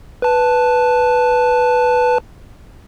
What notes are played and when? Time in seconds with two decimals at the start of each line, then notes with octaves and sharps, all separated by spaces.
0.22 B4 A5